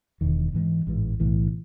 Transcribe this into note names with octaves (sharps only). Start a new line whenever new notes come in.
E1 E2 D#3
G#2 E3 G#3
A1 G#2 E3
B1 A2 E3